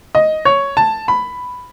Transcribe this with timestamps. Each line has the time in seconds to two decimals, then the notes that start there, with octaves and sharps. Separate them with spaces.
0.15 D#5
0.45 C#5
0.77 A5
1.08 B5